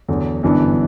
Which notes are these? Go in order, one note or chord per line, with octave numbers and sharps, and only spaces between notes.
E2 D3 F#3 A3
G1 F#2 E3 B3 D4